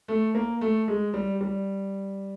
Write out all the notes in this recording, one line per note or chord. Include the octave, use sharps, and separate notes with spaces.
A3
A#3
A3
G#3
G3
G3